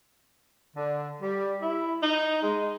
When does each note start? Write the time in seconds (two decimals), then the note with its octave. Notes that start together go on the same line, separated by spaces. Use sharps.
0.76 D3
1.22 G3
1.62 E4
2.03 D#4
2.43 G#3